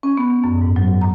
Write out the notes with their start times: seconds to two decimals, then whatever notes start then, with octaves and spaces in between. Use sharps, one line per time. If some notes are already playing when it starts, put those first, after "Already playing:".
0.03 C#4
0.17 B3
0.44 F#2
0.61 G#2
0.76 F#3
1.01 A#5